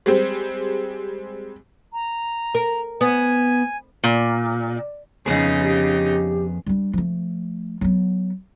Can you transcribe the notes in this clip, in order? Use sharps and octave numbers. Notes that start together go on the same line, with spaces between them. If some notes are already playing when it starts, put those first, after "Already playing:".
G3 G#3 C4
A#5
A#4
B3 G#5
A#2
F2 C#3 B3 D#4 G#4
G4
G3 D4
F3 A3
F#3 B3